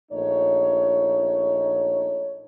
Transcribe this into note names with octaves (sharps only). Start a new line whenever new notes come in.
A#1 A3 D#4 C#5